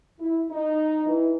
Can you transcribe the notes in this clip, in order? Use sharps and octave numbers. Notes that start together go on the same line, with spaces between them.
E4
D#4
E3